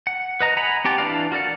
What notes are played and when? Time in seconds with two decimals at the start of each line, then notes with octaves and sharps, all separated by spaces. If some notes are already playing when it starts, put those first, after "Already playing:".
0.07 F#5
0.41 B4 D#5 A#5
0.57 F#5 G#5 A#5 B5
0.85 C4 G4 G5 A5
0.98 E3 D4 B4 D5 F5
1.32 F#4 A#4 D5 F#5